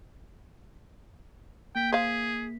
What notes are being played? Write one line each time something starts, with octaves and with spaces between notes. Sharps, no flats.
A#3 G5 B6
G#4 C5 F5